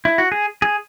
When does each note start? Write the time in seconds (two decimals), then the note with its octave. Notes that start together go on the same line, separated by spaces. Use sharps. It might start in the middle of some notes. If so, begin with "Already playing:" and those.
0.05 E4
0.18 F#4
0.32 G#4
0.62 G#4